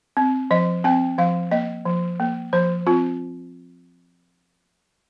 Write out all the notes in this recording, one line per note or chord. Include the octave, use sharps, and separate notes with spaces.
C4
F3 D#5
C4 G5
F3 F5
A#3 D#5
F3
A#3
F3 C5
C4 F4